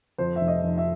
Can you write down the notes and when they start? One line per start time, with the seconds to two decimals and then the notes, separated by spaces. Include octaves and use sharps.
0.18 F2 C5
0.36 F1 E5
0.48 D#5
0.63 F1
0.78 E5